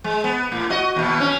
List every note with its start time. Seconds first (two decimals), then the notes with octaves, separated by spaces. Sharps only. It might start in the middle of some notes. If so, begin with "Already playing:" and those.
0.04 G#3
0.24 B3
0.52 A2
0.70 F#4 D#5
0.96 D#2 B2
1.20 C#4